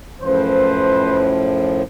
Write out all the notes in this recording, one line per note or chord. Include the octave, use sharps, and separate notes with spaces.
F#2 A2 F3 B4 C5